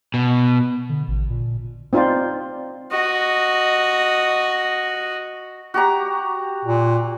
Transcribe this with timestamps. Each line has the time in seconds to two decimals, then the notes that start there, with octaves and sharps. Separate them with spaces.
0.14 B2
0.89 D3
1.08 A1
1.30 A#2
1.93 C4 D#4 F4 C5 D5
2.91 F#4 D#5
5.74 F#4 G4 A#5
6.65 A#2